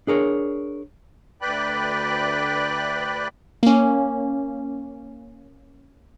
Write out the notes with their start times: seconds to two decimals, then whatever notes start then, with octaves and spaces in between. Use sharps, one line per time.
0.07 D4 G#4 A#4 C#5
1.42 D2 B4 D5 G5 B5 F#6
3.63 A#3 C#4